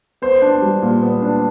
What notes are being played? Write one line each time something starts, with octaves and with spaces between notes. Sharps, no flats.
B3 C5
D4
G3
A#2
B3
D4